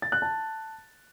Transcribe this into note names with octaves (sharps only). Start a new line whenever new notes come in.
A6
F#6
A5